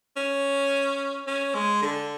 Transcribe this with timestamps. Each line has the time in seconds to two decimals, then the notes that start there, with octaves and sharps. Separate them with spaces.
0.17 C#4
1.27 C#4
1.54 G#3
1.82 D3